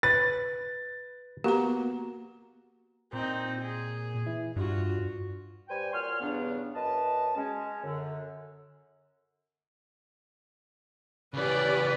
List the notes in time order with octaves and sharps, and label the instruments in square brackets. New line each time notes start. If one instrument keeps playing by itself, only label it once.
[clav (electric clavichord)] B4 [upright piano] A6
[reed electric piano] A#3 B3 F#4 [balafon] G4 A#5
[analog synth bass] A#2 [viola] C4 D#4
[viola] G#4
[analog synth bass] E3
[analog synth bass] G2 [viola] F4 F#4
[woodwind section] G3 B4 C5 G5 G#5
A#2 F#4 C#5 C6 F6
E2 G2 C#3 B3 D4
F#2 B4 D#5 A5
G#3 C#4
F#2 D3
[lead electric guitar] C#3 E3 [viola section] C#4 G4 D5 [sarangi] B4